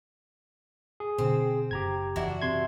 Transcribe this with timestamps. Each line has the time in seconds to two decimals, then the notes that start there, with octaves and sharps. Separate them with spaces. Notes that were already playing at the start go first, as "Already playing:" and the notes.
1.00 G#4
1.18 B2 D3 C4
1.71 F#1 G4 A#5 G#6
2.16 F#1 E2 D4 E4 F#4
2.42 C3 C6 G#6